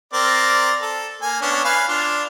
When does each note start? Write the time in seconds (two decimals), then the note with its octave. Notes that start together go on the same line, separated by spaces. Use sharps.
0.13 C4 A#4 D5
0.82 A4
1.22 A#3 G#5
1.42 B3 C#4 D4
1.65 B4 F5 G#5
1.88 D4 F4